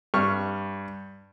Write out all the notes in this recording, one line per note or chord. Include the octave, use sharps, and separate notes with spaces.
G2 C#6 F6